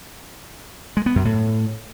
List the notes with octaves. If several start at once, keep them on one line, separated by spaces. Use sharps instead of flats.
G#3
B3
F#2
A2